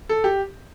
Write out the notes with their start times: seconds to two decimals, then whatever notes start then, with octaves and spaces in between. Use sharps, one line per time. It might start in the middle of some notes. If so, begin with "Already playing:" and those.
0.09 A4
0.24 G4